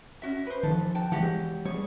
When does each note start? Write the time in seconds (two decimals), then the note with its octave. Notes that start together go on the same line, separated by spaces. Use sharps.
0.22 C#4 F#4 E5
0.47 B4 C5
0.63 D#3 F3 A4
0.95 F#4 G5 A5
1.12 E3 F3 G#3 F#4 G4 F#5
1.65 G3 G#4 C#5